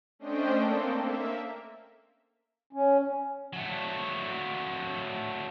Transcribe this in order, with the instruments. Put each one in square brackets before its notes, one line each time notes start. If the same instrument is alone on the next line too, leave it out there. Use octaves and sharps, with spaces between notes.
[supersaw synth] A3 C#4 D4 C5 D#5 G5
A#3 C4 A4
A#3 E5
[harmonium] C#4
[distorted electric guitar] F#3 A3